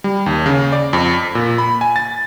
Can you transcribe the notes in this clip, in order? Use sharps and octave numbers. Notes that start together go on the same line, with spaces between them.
G3
D#2
C#3
D5
F2
B6
A#2
B5
G#5
A6